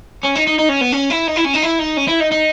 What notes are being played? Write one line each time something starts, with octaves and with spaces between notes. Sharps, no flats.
C#4
D#4
D#4
D#4
C#4
B3
C#4
E4
D#4
E4
C#4
D#4
E4
D#4
C#4
E4
D#4
D#4